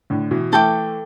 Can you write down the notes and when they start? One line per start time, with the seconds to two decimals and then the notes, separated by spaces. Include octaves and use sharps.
0.10 A2 D3
0.31 B2 E3
0.52 E3 A3 A4 G5 D6